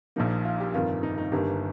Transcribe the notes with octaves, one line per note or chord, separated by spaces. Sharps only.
A#1 A#2 F3 A#3 D#4
F4
G4
G1 F2 D#3 A#3 F4
D#4
D#4
G1 G2 D#3 A#3 G4